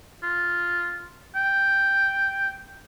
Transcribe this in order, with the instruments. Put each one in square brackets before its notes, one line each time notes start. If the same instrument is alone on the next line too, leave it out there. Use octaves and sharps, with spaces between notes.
[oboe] F4
G5